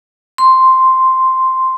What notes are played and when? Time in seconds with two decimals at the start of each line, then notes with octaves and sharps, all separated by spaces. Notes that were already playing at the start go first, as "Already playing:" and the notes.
0.38 C6